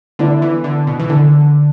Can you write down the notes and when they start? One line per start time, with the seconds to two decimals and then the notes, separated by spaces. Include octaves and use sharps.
0.19 D3 B3 E4 D5
0.42 E3
0.64 D3
0.87 B2
1.00 E3
1.09 D3